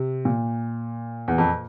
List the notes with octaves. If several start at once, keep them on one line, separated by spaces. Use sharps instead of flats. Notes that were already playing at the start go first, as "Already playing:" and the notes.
Already playing: C3
A#2
E2
F2